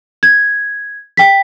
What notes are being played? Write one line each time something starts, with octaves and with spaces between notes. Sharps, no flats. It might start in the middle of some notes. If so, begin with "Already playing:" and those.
G#6
G5 B6